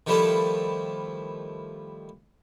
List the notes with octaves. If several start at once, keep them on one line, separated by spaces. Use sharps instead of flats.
D#3 F3 G3 A3 E4 A4